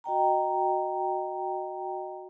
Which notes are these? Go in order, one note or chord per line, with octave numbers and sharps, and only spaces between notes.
F#4 D#5 G5 A#5